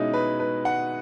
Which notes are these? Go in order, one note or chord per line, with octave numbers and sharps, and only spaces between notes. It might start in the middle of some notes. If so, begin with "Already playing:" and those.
Already playing: B2 G#3 C#4 D#4 E4
B4
B4
F#5